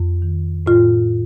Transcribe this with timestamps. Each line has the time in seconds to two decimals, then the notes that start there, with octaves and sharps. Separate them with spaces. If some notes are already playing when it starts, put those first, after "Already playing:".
Already playing: F2
0.22 D#3
0.66 A2 F4